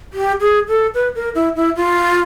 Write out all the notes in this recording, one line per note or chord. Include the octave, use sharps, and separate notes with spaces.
G4
G#4
A4
B4
A#4
E4
E4
F4